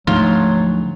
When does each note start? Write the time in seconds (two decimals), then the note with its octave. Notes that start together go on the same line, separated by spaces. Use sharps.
0.07 D2 G#2 F3 F#3 A3 F4